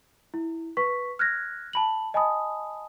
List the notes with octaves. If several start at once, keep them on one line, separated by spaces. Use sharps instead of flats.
E4
B4 C#6 B6
F6 F#6 G#6 A#6
A5 B5 F#7
D#5 G#5 A5 B5 D#6